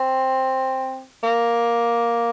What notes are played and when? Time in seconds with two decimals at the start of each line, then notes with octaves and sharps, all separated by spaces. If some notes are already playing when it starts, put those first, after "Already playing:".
Already playing: C4
1.23 A#3